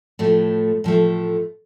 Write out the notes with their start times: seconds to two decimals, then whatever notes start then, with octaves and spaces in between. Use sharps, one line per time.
0.19 A2 F3 A3
0.84 A2 F3 A3